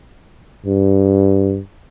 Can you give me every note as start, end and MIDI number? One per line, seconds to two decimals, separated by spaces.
0.66 1.61 43